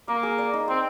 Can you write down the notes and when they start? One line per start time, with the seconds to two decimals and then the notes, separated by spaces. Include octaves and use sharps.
0.08 A#3 F5
0.23 G#4
0.38 D5
0.53 D#4
0.68 C4 C5